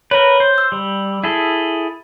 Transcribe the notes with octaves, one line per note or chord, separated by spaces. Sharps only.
A#4 B4 C#5
C5
E6
G3
E4 G#4 A4